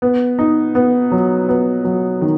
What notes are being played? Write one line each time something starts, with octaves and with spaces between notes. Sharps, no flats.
B3
D#4
B3
F#3
B3
F#3
D#3